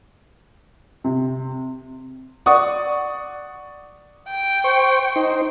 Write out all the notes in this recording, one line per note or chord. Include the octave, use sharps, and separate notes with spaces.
C3
D5 F#5 C#6 D#6
G5
C5 C#6
D#4 C5